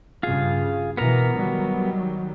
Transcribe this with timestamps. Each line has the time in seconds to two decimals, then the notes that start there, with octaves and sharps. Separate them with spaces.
0.23 G2 C#3 F4 G#4
0.97 B2 E3 B3 A#4 A#5
1.34 D#3 F#3 G3